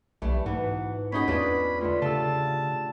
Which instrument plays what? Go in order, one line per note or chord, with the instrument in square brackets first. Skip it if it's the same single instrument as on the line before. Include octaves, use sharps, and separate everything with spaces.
[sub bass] B1 [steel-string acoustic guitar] E3 G3 A3
[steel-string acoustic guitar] E2 B2 E3 [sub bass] G#2 [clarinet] F#5
[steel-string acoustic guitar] F2 F#4 [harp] C#4 D#4 G#4 [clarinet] B5
[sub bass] E2 [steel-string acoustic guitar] G#3 B4 [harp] C#4 D4 F4
[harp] A2 D3 [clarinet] F4
[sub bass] C#3 [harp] F4 A4 E6 [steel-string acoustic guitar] G4 [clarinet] A5